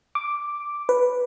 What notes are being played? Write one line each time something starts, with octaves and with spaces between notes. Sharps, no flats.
D6
B4